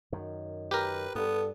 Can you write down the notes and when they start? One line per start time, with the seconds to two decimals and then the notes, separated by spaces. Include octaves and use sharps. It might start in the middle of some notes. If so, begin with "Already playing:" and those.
0.12 F#2 D#3
0.71 G4 A#4 B4
1.15 G2 B3 A4